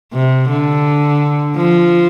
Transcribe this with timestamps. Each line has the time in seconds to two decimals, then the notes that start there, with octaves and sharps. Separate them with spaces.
0.13 C3
0.50 D3
1.56 F3